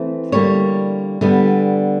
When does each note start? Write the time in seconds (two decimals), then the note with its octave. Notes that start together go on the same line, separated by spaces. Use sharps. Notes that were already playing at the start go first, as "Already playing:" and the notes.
Already playing: E3 A3 C4
0.32 D3 G3 A#3 C#5
1.21 D3 G3 B3